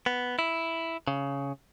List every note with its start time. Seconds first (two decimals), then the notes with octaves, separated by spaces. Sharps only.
0.06 B3
0.39 E4
1.07 C#3